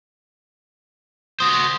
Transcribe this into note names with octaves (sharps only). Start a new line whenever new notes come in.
F#4 C5 D#6